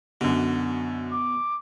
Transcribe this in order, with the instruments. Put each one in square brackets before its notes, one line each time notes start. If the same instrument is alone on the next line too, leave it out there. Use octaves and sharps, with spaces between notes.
[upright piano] F#2 D3 [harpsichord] B2
[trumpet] D6